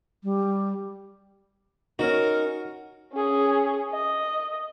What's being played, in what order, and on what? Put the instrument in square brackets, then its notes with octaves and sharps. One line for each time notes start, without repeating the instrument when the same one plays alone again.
[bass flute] G3
[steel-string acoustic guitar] C#4 D#4 [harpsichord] F#4 [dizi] A#4
[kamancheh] C#4 G#4
D#5